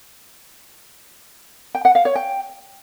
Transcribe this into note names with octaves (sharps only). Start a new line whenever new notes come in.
G5
F#5
F5
C#5
G5